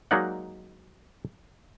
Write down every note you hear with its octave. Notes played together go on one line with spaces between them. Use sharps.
F#3 G#3 A#3 D#4 D5 F#5